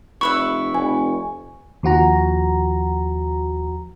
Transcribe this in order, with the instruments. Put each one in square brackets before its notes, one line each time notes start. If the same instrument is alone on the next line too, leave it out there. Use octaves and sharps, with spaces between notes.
[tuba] F1 [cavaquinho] E4 B4 E5 [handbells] C#6
[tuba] F1 [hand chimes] G#5
[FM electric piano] D#2 F3 F#4 A#5